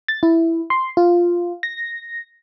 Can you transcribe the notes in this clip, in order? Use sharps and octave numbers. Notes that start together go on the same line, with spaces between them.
A6
E4
C6
F4
A#6